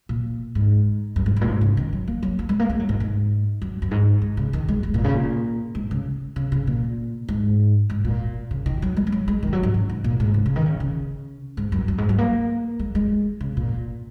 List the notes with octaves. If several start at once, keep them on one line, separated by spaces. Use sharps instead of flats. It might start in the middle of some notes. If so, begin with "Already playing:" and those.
A#2
G#2
F#2
G#2
F#2
A#2
G#2
C#3
D#3
F#3
A#3
F#3
A#3
G#3
A#3
G#3
F#3
G#2
G#2
F#2
F#2
G#2
G#2
C#3
D#3
G#3
G#3
A#2
C#3
A#2
G#2
C#3
C#3
C#3
A#2
G#2
G#2
A#2
C#3
D#3
F#3
G#3
G#3
F#3
G#3
D#3
F#3
G#2
F#2
G#2
A#2
G#2
C#3
C#3
D#3
C#3
C#3
G#2
F#2
F#2
G#2
F#3
A#3
G#3
G#3
C#3
A#2